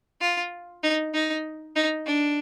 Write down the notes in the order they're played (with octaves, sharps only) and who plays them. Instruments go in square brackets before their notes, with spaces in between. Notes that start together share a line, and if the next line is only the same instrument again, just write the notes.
[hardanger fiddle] F4
D#4
D#4
D#4
D4